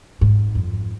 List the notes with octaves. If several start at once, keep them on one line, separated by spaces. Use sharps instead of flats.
G#2
F2